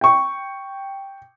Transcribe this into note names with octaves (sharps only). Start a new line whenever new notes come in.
G5 C#6